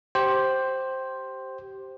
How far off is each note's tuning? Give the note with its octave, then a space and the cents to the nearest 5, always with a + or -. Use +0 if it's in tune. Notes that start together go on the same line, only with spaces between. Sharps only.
G4 -15 C5 +5